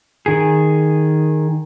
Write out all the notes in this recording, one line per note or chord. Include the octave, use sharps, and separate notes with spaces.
D#3 G#4